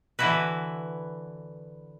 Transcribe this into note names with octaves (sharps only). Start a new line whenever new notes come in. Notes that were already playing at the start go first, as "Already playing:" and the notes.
D3 E3 E4 F#4 B4